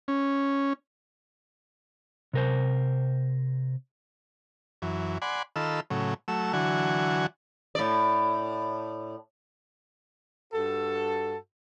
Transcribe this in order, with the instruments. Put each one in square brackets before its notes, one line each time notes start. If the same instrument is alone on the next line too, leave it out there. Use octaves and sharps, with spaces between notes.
[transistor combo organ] C#4
[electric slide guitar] C3 A#4 C5
[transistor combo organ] F#2 E3
D5 F#5 G#5 B5 C6
D#3 F4 A4 B5 E6
A2 C#3 F#3
F#3 A3 E6
D3 E3 F#3 F#4 G#5
[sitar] A2 D5
[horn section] G2 F#4 A4